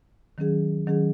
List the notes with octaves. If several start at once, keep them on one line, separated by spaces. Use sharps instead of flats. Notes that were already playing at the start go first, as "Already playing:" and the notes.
D#3 F#3 C#4 G#4
D#3 F#3 C#4 G#4